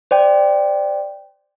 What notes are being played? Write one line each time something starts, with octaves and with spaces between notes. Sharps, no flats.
C5 D5 G5